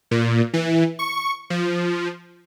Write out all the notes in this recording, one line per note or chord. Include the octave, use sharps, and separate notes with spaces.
A#2
E3
C#6
F3